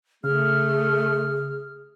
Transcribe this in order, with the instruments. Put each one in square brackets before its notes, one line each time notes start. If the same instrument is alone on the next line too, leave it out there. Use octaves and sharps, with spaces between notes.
[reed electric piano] C#3 [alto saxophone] A3 [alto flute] G#4 [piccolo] F6